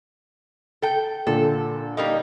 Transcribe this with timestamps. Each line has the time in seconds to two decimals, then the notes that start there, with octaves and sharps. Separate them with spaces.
0.82 A4 G5
1.27 A#2 D3 A4
1.97 G3 A#3 D#4